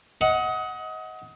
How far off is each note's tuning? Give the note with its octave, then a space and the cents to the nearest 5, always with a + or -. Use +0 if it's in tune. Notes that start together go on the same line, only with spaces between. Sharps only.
D#5 +25 F#5 +0